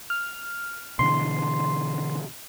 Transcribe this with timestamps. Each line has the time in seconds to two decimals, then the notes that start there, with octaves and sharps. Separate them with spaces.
0.10 F6
0.99 B2 D3 E3 C6